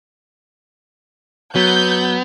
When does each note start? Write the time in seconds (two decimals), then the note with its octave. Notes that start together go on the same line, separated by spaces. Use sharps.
1.56 F#3 B3 G6